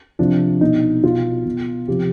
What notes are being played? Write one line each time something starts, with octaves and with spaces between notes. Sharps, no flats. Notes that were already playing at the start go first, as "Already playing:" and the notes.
C3 F3 D4
B2 D#4
B2 F4
B2
C3 F3 G4